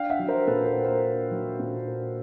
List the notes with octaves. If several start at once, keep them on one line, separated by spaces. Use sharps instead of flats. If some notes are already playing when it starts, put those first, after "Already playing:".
Already playing: D4 F5 G5
E5 F#5
F#3
A#4 C5
A#2 A4 B4
A#4 C5
A#3
A#4 C5
D4
F#3
A#2
A#3